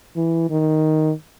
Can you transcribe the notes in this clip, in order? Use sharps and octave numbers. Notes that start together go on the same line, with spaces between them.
E3
D#3